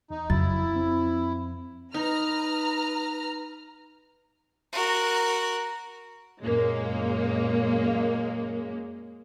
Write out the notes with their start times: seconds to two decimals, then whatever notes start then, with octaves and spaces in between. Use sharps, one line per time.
0.10 E2 D#4
0.30 F2 C#3 F#3 E4 A6
0.76 C4
1.94 D#4 B4 A#5 F6
4.73 F#4 A#4
6.44 F#2 A#2 G#3 A#3 C#4